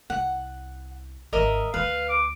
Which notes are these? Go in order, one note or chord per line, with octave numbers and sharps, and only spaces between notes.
C2 F#5
G#1 D3 A#4 D#5 E5
D2 D3 B4 F5
D6